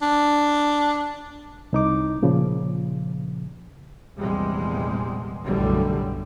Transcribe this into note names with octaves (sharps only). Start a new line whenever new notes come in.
D4
C2 D#4 D6
A#2 C#3 F3
A#1 E2 C3 G3 G#3
B1 F#2 A2 D3 G3